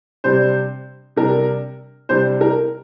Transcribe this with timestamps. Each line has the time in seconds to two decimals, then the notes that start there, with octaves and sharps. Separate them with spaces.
0.24 C3 G3 D4 C5
1.16 C3 G3 D4 A#4
2.09 C3 G3 D4 C5
2.41 A#4